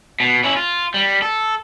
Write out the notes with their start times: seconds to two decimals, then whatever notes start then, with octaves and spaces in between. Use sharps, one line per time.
0.20 B2
0.44 C#4 E4
0.56 F4
0.94 G3
1.22 A4